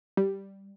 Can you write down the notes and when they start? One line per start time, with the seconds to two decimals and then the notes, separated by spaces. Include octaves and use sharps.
0.17 G3